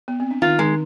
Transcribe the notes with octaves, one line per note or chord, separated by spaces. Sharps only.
B3
C4
D4
D#3 D#4 F4
D#3 G#3 D#4